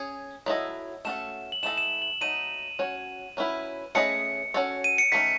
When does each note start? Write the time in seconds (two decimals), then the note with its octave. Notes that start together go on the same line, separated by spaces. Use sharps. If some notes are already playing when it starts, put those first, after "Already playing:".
Already playing: C#4 G#4 C#5
0.46 F#3 B3 E4 A4 D#5
1.05 A3 C#4 F#4 A4 E7
1.52 F#7
1.63 E3 A3 E4 A4 D#5 E7
1.78 E7
1.83 F#7
2.02 F#7
2.21 F#3 A3 D#4 D#7
2.79 F#3 C#4 F#4 C#5
3.37 F#3 C#4 E4 B4
3.95 A3 C#4 G#4 B4 D#5 C#7
4.54 C#4 F#4 A4 C#5
4.84 D#7
4.98 C#7
5.12 D#3 A3 C#4 B6